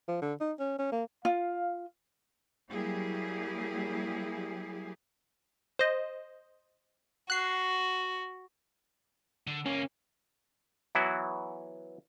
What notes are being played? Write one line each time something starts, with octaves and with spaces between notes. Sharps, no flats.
F3
D3
D#4
C#4
C#4
A#3
F4 F5
F#3 G3 A#3 E4 G4 G#4
C5 D#5
F#4 F#6 C7
D3
C#2 A#3 C#4
E3 F#3 B3 E4 F#4